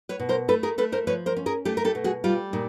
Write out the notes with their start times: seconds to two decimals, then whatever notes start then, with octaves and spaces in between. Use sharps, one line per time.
0.09 B4 C#5
0.20 B2
0.29 A#4 C5
0.48 A3 A4 B4
0.63 G#4 A#4
0.78 A3 A4 B4
0.92 A#4 C5
1.07 F3 B4 C#5
1.26 A#4 C5
1.36 C#4
1.46 G#4 A#4
1.65 A3 G4 A4
1.77 A#4
1.85 G4 A4
1.95 B2
2.04 F#4 G#4
2.24 G3 F4 G4
2.53 A#2 D#4